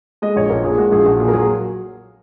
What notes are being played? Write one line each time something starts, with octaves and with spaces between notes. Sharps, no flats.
G#3 D#5
A#1 C#5
A#1 A#4
A#2 G#4
G#3 F#4
A#1 G#4
A#1 F#4
A#2 G#4
A#4
F#3 G#4